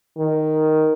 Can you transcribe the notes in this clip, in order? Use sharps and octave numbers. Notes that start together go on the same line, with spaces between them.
D#3